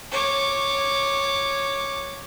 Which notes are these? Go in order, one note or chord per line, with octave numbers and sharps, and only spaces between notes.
C#5 D6